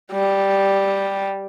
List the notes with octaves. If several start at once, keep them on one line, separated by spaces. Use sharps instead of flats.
G3